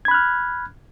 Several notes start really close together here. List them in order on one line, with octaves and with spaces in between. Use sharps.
G#6 B5 F#6 F6